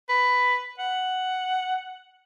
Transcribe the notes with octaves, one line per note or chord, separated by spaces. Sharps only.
B4
F#5